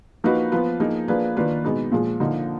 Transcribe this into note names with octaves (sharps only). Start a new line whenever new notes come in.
F3 A#3 D#4 F#4 B4
F3 B3 F4 B4
F3 A#3 D#4 G#4
F3 A#3 D4 G#4 B4
D#3 A#3 D4 F4 B4
B2 G#3 B3 D#4
A#2 F3 G#3
D3 F3 A#3 D#4